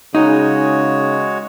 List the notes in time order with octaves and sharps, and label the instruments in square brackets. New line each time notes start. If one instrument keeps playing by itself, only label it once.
[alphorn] C#3 [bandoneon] G#3 F#4 C#5 [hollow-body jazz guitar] D#4